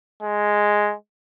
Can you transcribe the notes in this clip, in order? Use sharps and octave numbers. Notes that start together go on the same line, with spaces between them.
G#3